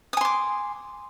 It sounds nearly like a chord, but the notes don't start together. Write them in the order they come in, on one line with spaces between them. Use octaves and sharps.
D#6 G#5 C6 D6